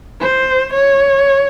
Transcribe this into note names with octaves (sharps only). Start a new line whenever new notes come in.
C5
C#5